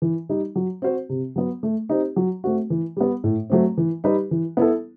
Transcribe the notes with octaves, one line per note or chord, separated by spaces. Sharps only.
E3
G3 D#4
F#3
C4 F#4 C5
C3
F#3 B3
A3
C4 D#4 G4
F#3
A3 C4 F#4
E3
G3 B3
A2
F#3 A3 C4
E3
G3 D#4 G4 B4
E3
B3 E4 A4